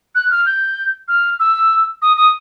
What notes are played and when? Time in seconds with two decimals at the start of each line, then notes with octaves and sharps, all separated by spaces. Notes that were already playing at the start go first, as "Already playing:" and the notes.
0.15 F#6
0.31 F6
0.46 G6
1.08 F6
1.40 E6
2.02 D#6
2.17 D#6